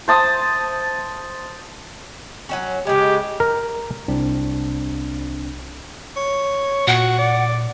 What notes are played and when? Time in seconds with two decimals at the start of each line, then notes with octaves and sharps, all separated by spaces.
0.08 C5 A5 D#6
2.49 F#3 G3 C#4
2.87 C#3 G#3 G4
3.40 A#4
4.08 C2 C4 D4
6.16 C#5
6.87 A#2 F#4 F#5
7.19 D5